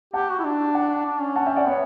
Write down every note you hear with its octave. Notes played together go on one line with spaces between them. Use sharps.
G4 F#5 A5
F#4
E4
D4
F#5 A5
D4
C#4
F#5 A5
E5 G5
D5 F#5
B3 C#5 E5